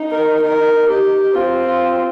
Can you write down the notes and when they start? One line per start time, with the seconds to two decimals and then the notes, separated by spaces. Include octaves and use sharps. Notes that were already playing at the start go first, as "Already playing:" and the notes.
Already playing: D#4
0.10 A#4
0.42 A#4
0.88 G4
1.34 C4 F4
1.66 F4